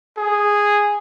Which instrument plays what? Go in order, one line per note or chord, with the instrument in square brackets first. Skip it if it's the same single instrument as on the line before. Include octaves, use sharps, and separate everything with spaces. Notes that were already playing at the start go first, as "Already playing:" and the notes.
[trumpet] G#4